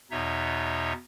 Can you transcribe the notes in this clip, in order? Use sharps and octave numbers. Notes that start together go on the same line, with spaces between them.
E2 B2 D#4 C#5 E5